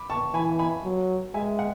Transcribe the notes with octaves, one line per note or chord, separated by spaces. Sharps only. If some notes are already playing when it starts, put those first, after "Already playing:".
Already playing: B5 D6
A5 C#6
E3 G#5 B5
G#5 B5
F#3
G#3 E5 G#5
F#5